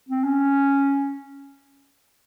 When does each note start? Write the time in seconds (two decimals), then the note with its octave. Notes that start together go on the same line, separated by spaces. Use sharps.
0.09 C4
0.24 C#4